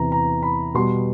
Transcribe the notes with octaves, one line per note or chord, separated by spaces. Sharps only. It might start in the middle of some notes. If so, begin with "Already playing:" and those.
Already playing: E2 C3 E3 A#5
A#5
B5
B2 G3 B3 C6